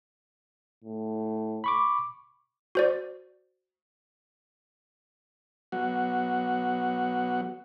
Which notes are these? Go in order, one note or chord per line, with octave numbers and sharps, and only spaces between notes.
A2
B5 C#6 D6
F#4 C5 D5
F#3 B3 F#4 F#5